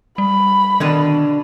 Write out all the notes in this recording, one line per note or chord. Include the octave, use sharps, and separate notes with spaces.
G3 B5
B2 D3 D#3 D4 D#7